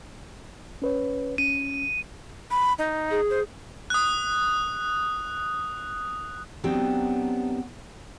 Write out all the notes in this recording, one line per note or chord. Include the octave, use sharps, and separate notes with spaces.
C#4 B4 C#5
C#4 D#7
B5
D#4
G#4
C5
D#6 F#6
F#3 B3 C4 D4 D#4 G4